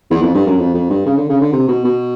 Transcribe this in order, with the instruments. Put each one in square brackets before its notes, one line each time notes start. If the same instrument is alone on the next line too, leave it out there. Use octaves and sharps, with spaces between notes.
[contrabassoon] E2
F2
G2
F#2
F2
F2
G2
C#3
D3
C#3
D3
C3
B2
B2